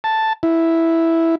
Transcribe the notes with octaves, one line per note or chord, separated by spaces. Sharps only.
A5
E4